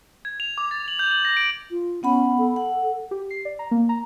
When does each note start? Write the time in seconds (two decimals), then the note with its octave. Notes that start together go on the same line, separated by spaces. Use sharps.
0.25 G#6
0.40 F7
0.58 D6
0.71 A6
0.88 F#7
0.99 G6
1.11 F#7
1.25 A#6
1.37 D7
1.71 F4
2.03 B3 C#4 F#5 B5
2.38 A4
2.56 F#5
3.11 G4
3.30 C7
3.45 D5
3.59 A#5
3.71 A#3
3.89 A#5